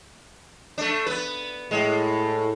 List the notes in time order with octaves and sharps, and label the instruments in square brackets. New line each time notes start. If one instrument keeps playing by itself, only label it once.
[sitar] A3 D4
B3 B4
[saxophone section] A2 [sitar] G#3